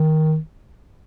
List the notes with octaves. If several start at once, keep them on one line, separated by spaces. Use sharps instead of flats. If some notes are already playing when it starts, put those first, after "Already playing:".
Already playing: D#3